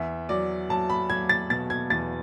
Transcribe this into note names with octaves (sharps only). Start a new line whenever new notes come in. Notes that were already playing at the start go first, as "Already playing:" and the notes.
Already playing: E2 E5
F#3 D5
F#3 A5
B5
F#3 G#6
A6
B2 A6
G#6
E2 A6